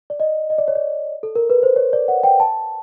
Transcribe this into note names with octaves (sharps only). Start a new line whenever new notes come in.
D5
D#5
D#5
D5
C#5
D5
A4
A#4
B4
C5
C#5
D5
F#5
G5
A5